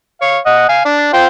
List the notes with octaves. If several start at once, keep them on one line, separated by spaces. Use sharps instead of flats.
C#5 F5
D#5 F#5
F5 G#5
D4 D5
F4 C5 G5